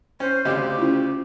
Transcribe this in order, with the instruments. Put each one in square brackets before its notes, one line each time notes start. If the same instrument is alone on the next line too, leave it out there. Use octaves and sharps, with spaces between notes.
[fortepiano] C#4 [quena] C5
[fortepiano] D2 C#3 C4 [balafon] A3 D#5 [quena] G4
[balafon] C#4 E4 F4